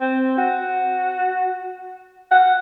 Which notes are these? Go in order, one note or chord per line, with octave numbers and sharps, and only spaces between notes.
C4
F#4
F#5